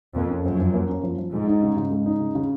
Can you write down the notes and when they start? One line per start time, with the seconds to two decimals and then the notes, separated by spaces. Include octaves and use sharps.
0.15 F2 A#3
0.30 C#4
0.45 F#2 F3
0.60 F3
0.74 A#3
0.89 C#4
1.04 F3
1.18 F3
1.33 G#2 G#3
1.47 D#4
1.63 C#3
1.77 C#3
1.91 G#3
2.06 D#4
2.20 C#3
2.35 C#3